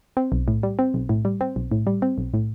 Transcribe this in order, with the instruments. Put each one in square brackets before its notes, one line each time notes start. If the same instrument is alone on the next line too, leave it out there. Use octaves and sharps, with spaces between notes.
[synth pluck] C4
B1
A2
G3
C4
B1
A2
G3
C4
B1
A2
G3
C4
B1
A2